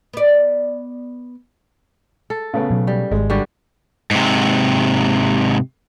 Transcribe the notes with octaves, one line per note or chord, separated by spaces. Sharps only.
B3 D5
A4
C#3 A3 B3
B2 F#3
G3
G#1 G#3
D3 G3 F#4
G#2 C3